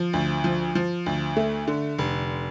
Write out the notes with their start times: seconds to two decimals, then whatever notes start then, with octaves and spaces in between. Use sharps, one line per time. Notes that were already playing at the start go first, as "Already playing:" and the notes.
Already playing: F3
0.13 D2
0.44 F3
0.75 F3
1.06 D2
1.36 A3
1.68 D3
1.98 F1